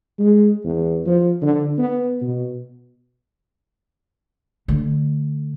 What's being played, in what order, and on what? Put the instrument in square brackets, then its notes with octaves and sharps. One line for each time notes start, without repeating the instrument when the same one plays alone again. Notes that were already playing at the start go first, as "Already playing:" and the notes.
[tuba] G#3
E2
F3
D3
B3
B2
[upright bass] D3 A3